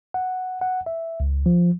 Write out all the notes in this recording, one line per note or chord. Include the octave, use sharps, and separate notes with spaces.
F#5
F#5
E5
C#2
F3